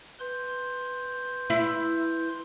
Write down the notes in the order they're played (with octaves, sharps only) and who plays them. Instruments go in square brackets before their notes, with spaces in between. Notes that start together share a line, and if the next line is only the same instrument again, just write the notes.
[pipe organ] B4 C6 G6
[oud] E4